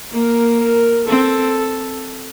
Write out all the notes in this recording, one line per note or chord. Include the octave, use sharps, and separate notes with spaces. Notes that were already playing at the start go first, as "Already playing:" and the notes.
A#3 A#4
A#4
C4 A4